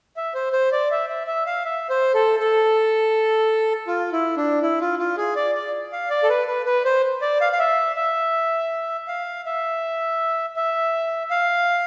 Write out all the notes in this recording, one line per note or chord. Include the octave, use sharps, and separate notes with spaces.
E5
C5
C5
D5
E5
E5
E5
F5
E5
C5
A4
A4
F4
E4
D4
E4
F4
F4
G#4
D5
D5
F5
D5
A4
B4
B4
B4
C5
D5
F5
F5
E5
E5
F5
E5
E5
F5